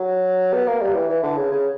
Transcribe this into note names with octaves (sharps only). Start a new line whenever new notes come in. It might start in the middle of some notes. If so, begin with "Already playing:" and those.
Already playing: F#3
B3
A#3
G3
E3
E3
D3
C#3
C#3